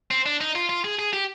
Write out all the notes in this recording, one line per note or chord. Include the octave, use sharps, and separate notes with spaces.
C4
D4
D#4
F4
F4
G#4
G#4
G4